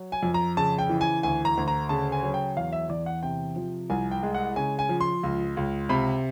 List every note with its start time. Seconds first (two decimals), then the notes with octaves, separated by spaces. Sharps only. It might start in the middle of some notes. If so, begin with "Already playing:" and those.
Already playing: F#3
0.12 G#5
0.23 F2
0.34 A#5
0.57 C#3 A5
0.78 G5
0.89 E3
1.01 G#5
1.23 D2 G#5
1.45 A#5
1.57 D2
1.68 A#5
1.89 C#3 A5
2.12 G#5
2.23 F#3
2.34 G5
2.57 E2 F5
2.73 E5
2.89 E2 D5
3.06 F#5
3.23 C3 G5
3.56 F3
3.90 C2 G#5
4.11 G5
4.23 G#3
4.34 F#5
4.56 C#3 G#5
4.79 G#5
4.89 F3
5.01 C6
5.23 C#2
5.57 C#2
5.89 C3 B5